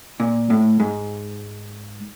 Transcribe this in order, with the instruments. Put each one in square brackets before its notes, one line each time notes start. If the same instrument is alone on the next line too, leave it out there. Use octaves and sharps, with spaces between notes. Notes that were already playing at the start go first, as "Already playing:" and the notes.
[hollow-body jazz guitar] A#2
A2
G#2